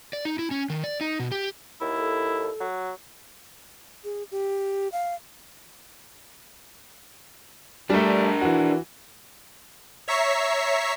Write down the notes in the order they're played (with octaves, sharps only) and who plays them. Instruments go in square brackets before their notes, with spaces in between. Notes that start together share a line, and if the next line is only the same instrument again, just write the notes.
[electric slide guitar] D5
D#4
E4
C#4
D#3
D5
D#4
B2
G4
[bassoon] D#2 [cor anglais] E4
[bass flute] A4
[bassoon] F#3
[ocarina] G#4
G4
F5
[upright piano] G3 A3 [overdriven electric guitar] D4 A#4
[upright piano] E3 F#4
[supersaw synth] C#5 E5 A#5 C#6 B6 C7